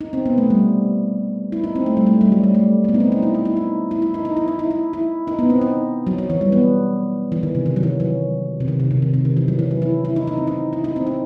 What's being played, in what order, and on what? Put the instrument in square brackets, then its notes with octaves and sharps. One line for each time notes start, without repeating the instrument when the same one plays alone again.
[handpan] D#4
C4
B3
A3
G3
E4
D#4
C4
A3
G3
A3
G3
F#3
G3
A3
A3
B3
D#4
C4
D#4
E4
D#4
E4
D#4
E4
E4
D#4
D#4
E4
D#4
E4
E4
E4
D#4
B3
C4
D#4
F#3
F#3
E3
G3
B3
E3
D#3
C3
D#3
F#3
E3
F#3
C3
D#3
C3
C3
D#3
C3
D#3
E3
F#3
E3
F#3
E4
E4
D#4
D#4
C4
D#4
E4
D#4
C4
D#4